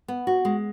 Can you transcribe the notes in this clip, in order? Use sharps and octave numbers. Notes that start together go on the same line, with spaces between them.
B3
F#4
G#3